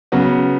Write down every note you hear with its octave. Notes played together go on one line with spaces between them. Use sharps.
C#3 F#3 B3